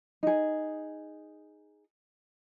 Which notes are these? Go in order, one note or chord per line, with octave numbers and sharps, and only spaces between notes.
D#4 G#4